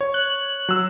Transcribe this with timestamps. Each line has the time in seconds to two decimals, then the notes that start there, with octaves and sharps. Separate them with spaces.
0.01 C#5
0.14 F#6
0.69 F#3 E6